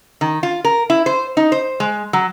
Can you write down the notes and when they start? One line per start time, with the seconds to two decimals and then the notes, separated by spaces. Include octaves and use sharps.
0.21 D#3
0.43 F4
0.65 A#4
0.90 E4
1.06 C5
1.37 D#4
1.52 C5
1.80 G#3
2.13 F#3